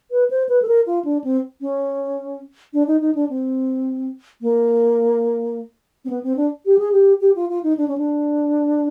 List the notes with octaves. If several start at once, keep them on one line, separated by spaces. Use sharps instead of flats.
B4
C5
B4
A4
A#4
F4
D4
C4
C#4
D4
D#4
D#4
D4
C4
A#3
C4
B3
C4
D4
G4
G#4
G4
G4
F4
F4
D#4
D4
C#4
D4